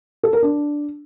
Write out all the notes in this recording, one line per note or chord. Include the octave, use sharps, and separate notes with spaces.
A4
A#4
D4